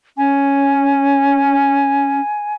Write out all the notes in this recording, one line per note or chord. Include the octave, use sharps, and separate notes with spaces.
C#4 G#5